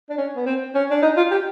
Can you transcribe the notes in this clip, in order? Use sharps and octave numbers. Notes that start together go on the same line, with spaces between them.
D4
C#4
B3
C4
C#4
D4
D#4
F4
G4